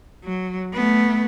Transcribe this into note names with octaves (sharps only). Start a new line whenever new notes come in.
F#3
A3 B3